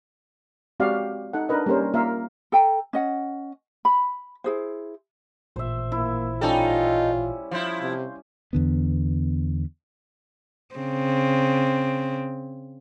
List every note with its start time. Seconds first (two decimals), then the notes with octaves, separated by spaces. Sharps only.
0.80 G#3 C4 F#4 G4 D5 F5
1.33 D#4 A4 F#5
1.49 D4 D#4 A#4 B4 D#5
1.66 G3 A#3 C#4 A#4 C5
1.94 A#3 F4 A#4 E5 F5
2.52 A4 G5 A#5
2.93 C#4 D#5 F#5
3.85 B5
4.44 E4 G#4 C5
5.56 A1 A#2 E3 C5 E5
5.92 A#3 E4
6.41 G3 C#4 D#4 F4 A4
7.51 F3 E4 F5 C6 G6
7.81 C3
8.53 E2 D3 B3
10.75 C#3 C4